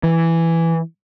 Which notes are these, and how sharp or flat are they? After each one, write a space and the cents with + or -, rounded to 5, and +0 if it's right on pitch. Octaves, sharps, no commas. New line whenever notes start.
E3 +5